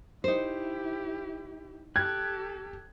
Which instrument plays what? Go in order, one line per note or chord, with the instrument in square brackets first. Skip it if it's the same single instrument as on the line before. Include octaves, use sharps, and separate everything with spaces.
[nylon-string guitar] D#4 C5 [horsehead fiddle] E4 G4
[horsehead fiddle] G4 A4 [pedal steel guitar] F#6 [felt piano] G#6